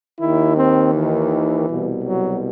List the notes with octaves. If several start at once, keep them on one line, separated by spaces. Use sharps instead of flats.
D#2 D#3 E4
C4
E3
C2 B2
F#3